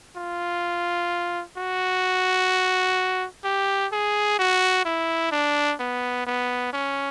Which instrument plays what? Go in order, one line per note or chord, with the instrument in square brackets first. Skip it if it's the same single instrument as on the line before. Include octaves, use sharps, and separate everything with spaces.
[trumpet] F4
F#4
G4
G#4
F#4
E4
D4
B3
B3
C#4